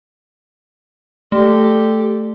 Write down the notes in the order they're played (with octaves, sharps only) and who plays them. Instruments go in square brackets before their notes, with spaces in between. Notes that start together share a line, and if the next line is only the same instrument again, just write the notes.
[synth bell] A3 [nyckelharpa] G4 A4